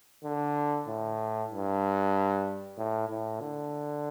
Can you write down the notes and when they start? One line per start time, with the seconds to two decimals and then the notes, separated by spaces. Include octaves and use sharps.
0.24 D3
0.87 A2
1.51 G2
2.77 A2
3.09 A2
3.41 D3